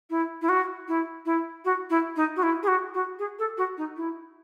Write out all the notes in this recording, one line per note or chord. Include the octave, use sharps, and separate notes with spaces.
E4
E4
F#4
E4
E4
F#4
E4
D#4
F#4
E4
G#4
F#4
F#4
G#4
A4
F#4
D#4
E4